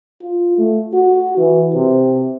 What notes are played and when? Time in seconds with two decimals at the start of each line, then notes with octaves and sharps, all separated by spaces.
0.22 F4
0.58 A3
0.94 F#4
1.37 E3
1.74 C3